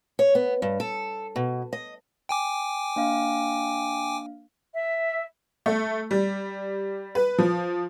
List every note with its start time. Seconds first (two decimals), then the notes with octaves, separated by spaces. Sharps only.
0.19 C#5
0.35 B3
0.62 G2
0.80 A4
1.36 B2
1.73 D#5
2.29 G5 G#5 D6
2.96 A#3 D4 F5
4.73 E5
5.66 A3
6.11 G3
7.15 B4
7.38 F3